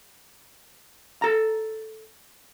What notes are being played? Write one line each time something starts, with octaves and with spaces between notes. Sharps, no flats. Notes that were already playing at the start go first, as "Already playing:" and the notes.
A4 A#5